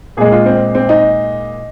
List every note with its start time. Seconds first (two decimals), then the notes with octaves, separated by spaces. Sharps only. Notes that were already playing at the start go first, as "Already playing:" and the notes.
0.17 A#2 G#3 G#4
0.31 F4
0.46 C4
0.75 C4
0.89 D#4